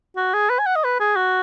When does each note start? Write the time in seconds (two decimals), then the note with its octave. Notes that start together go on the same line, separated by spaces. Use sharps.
0.16 F#4
0.34 G#4
0.50 B4
0.59 G#5
0.66 F#5
0.76 D#5
0.84 B4
1.00 G#4
1.16 F#4